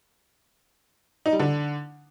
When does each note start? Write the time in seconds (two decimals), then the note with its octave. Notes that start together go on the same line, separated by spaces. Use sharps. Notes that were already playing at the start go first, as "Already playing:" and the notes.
1.26 D#4
1.33 G3
1.39 D3